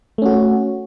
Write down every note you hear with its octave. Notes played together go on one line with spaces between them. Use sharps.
A3 C#4 F#4